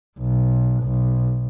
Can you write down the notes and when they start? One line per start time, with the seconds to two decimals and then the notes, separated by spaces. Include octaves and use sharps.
0.19 B1
0.83 B1